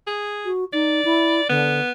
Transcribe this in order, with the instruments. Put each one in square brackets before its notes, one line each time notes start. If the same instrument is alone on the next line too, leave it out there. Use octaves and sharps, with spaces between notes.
[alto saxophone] G#4
[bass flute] F#4
[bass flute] D#4 [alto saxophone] D5
[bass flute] E4
[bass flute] D3 [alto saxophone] B3